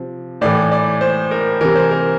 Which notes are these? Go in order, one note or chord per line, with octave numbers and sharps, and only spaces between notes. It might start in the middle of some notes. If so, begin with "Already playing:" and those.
Already playing: C3 F3
A2 E3 D5
D5
C5
A#4
C3 E3 A#4
C5
A#4